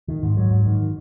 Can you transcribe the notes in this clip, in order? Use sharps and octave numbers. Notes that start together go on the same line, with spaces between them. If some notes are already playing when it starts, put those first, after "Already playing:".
D#3
G#2
F#3
G#2
D#3